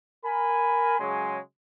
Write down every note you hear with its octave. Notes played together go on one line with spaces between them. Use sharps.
A#4 G#5 B5
C#3 F#3 G#3 C#5 G#5 C6